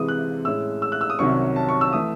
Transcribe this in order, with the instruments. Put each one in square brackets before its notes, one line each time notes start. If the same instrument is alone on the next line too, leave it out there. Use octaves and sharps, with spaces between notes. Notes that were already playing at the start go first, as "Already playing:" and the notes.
Already playing: [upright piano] C3 E3 G#3 D#6
F#6
A2 G#3 C#4 E6
E6
F#6
E6
D#6
C2 C3 D#3 F#3 C#4 C#6
A5
C#6
E6
E3 A3 D#6